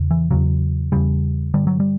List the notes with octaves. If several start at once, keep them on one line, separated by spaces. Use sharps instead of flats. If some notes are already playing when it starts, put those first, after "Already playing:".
Already playing: E2 C#3
E3
E2 C#3 F#3
E2 C#3 G3
G2 D3 G3
F#3
G3